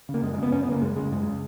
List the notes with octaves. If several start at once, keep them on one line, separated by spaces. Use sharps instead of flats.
C#3
A#3
F#2 G#3
G#3
C#3 B3
F#2 C#4
B3
C#3 A#3
F#2 G#3
C#3 G#3
F#2 G#3
C#3